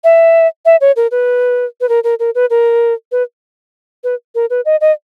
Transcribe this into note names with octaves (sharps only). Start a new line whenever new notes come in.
E5
E5
C#5
A#4
B4
B4
A#4
A#4
A#4
B4
A#4
B4
B4
A#4
B4
D#5
D#5